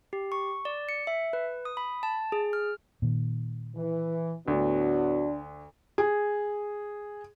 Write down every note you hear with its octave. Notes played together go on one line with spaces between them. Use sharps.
G4
C#6
D5
C#7
E5
B4
D#6
B5
A5
G#4
F6
A#2 D#3
E3
D2 A2 B3 D4 F#4
G#4